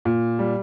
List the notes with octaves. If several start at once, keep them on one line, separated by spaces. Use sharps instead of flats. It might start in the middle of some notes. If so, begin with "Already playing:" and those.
A#2
G3